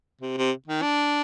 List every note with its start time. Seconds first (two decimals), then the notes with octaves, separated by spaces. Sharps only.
0.21 C3
0.37 C3
0.68 D#3
0.82 D4